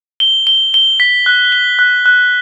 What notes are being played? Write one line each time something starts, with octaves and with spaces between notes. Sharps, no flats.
G7
G7
G7
B6
F#6
G7
F#6
F#6